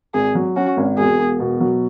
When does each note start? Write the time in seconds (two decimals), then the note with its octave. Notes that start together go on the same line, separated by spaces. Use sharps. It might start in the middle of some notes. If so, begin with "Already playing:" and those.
0.14 G#1 G#4
0.35 F#3
0.56 C#4 F#4
0.77 G#1
0.97 E1 G#4
1.19 E1
1.40 B2
1.60 F#3